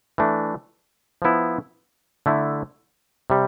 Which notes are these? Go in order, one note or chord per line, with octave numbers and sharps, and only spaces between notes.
E3 A3 D4
F3 B3 E4
D3 A3 E4
C3 G3